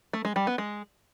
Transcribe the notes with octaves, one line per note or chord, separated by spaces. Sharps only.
A3
G#3
G3
B3
G#3